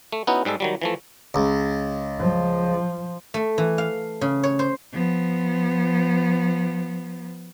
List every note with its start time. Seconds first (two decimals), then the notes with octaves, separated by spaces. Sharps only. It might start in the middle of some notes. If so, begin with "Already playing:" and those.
0.12 A3
0.27 B3 C#4 D#4 E4 F#4
0.45 G#2 G3 G#3 A4
0.60 D#3 F#3 G3
0.82 E3 F3 A3
1.34 C#2
2.19 F3
3.34 A3
3.58 E3
3.78 F5
4.21 C#3
4.43 C#5
4.59 C5
4.93 F3 B3